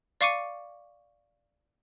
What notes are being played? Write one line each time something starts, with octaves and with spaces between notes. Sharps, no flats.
D5 F5 C#6 D6 C#7 D#7